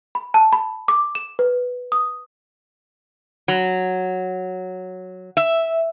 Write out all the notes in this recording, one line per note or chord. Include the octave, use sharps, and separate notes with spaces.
B5
A5
B5
D6
E7
B4
D#6
F#3
E5